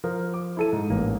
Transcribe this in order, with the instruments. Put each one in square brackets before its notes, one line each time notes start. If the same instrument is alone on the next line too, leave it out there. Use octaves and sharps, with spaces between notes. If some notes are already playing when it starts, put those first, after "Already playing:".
[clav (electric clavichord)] F3 [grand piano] A#4
[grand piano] D6
E4 A4 D#7
G#2
[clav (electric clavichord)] A1 A#3